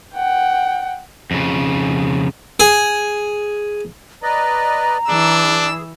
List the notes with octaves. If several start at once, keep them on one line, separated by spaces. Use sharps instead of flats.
F#5 G5
F2 C#3
G#4
B4 D5 D#5 A#5
E3 D4 G#4 E6